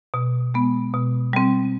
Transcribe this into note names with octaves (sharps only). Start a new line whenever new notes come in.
B2
G#3 B3
B2
G3 C4